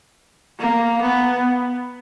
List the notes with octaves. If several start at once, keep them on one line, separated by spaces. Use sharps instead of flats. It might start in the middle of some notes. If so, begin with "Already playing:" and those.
A#3
B3